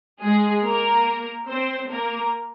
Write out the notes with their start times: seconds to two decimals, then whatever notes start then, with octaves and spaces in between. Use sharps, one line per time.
0.20 G#3 G#4
0.63 A#3 A#4
1.49 C4 C5
1.90 A#3 A#4